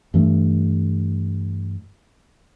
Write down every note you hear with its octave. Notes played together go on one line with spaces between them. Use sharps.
G2 E3 A3